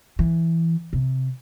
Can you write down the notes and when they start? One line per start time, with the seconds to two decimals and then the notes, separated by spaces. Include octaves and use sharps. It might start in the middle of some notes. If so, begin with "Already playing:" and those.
0.19 E3
0.93 C3